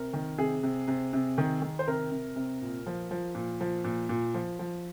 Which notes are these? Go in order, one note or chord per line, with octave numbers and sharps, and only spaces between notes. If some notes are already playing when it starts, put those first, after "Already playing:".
Already playing: C3 A#4
D#3
C3 G#4
C3
C3
C3
D#3
D#3
C5
C3 A#4
C3
C3
A#2
F3
F3
A#2
F3
A#2
A#2
F3
F3